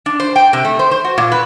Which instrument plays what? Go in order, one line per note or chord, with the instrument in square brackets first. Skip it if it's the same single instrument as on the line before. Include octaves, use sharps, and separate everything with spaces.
[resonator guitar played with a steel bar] D4
C5
G5
C3
A3
C5
C5
F#4
A#2
B4